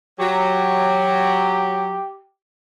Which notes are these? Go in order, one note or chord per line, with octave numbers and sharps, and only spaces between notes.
F#3 G4